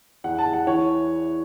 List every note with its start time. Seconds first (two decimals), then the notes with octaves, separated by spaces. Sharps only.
0.24 E2 F#5
0.39 A5
0.46 E2
0.53 F#5
0.67 E3 C#5